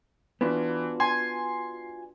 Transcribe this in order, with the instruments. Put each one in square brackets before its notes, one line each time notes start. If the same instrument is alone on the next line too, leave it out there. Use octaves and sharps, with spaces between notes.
[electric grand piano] E3 [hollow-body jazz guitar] B3 D4 [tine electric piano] F4 F#4
[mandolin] G#5 [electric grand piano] C6